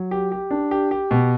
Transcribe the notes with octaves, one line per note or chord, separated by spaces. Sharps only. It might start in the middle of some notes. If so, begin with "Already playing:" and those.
Already playing: F#3
G4
G4
D4
G4
G4
B2